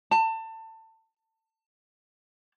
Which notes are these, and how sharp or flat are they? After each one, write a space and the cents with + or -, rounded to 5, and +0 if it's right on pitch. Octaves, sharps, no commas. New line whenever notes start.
A5 +25